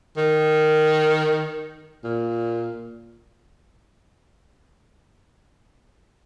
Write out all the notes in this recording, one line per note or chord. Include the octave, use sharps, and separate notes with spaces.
D#3
A#2